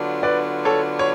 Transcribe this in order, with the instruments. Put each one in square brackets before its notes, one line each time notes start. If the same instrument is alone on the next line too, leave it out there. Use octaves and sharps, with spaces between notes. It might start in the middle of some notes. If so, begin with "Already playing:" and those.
Already playing: [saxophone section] D3 F#3 B3 D4 F4
[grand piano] B4 D5
A4 C#5
C#5